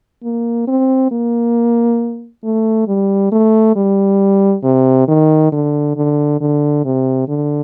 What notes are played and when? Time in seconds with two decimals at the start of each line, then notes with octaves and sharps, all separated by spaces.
0.23 A#3
0.67 C4
1.11 A#3
2.44 A3
2.88 G3
3.32 A3
3.76 G3
4.64 C3
5.08 D#3
5.52 D3
5.96 D3
6.41 D3
6.85 C3
7.28 D3